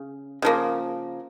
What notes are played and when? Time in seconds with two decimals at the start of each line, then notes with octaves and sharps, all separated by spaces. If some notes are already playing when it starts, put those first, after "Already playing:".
Already playing: C#3
0.42 C#3 F3 A#3